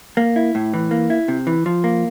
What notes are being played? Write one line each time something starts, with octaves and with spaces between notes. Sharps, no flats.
A#3
E4
A2
E3
A#3
E4
C3
E3
F3
A#3